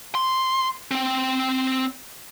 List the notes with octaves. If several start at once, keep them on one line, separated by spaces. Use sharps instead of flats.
C6
C4 G5